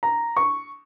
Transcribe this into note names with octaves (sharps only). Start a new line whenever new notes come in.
A#5
C#6